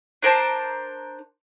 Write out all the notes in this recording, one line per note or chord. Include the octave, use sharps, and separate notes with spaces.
D4 A#4 C5 A5